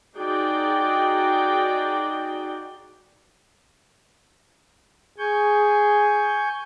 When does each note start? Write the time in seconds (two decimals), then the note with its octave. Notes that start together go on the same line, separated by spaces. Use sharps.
0.18 D#4 F#4 G#4 D5 G5
5.18 G#4 G#5 C#6 G6